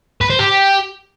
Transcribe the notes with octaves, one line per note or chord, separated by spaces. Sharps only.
B4
C5
G4